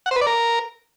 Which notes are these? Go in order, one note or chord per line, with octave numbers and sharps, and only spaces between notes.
F#5
C5
B4
D5
A#4